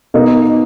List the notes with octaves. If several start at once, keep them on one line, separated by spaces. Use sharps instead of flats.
B2 A#3 D#4